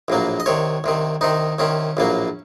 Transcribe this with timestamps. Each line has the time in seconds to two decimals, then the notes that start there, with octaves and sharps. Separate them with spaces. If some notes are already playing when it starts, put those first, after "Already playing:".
0.08 A#1 A2 F#3 A#3
0.40 D#5
0.46 C2 C3 D#3 C#5
0.84 C2 C3 D#3
1.21 C2 C3 D#3 D#4
1.59 C2 C3 D#3 C#4
1.97 A#1 A2 F#3 A#3